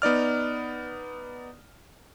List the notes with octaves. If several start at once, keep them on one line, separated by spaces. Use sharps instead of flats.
B3 D#4 D5 F6